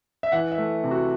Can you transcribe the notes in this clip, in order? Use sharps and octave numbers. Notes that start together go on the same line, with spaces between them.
E5
E3 F#5
E5
A3
C3
F#4